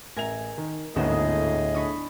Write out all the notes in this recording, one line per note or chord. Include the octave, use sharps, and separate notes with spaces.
A1 A#4 E5 G#5 A#5 F7
D#3
G#1 D2 A2 A#3 B3 G#4 D#5 E7
D4 B5 C#6 D#6